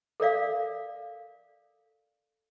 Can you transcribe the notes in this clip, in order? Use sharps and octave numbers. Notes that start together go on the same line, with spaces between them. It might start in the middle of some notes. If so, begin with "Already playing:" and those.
A4 A#4 D5 F5